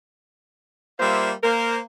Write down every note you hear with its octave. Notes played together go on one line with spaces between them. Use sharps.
G3 A#3 F4 C5 E5
A#3 A#4 C5